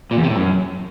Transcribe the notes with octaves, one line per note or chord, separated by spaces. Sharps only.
A#2
E2
C3
A2
F#2